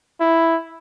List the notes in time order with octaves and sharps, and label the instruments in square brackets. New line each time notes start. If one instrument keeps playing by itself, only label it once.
[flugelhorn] E4